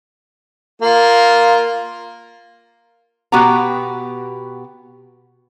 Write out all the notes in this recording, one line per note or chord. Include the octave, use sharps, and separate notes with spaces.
A#3 F4
B2 B3 F#4 G4 F#5 A#5